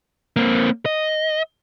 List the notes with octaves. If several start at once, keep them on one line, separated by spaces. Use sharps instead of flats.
A#3 C4
D#5